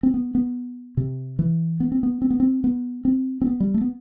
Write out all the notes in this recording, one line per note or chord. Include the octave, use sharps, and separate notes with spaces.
C4
B3
B3
C3
E3
B3
C4
B3
C4
B3
C4
B3
C4
C4
B3
G3
A3
B3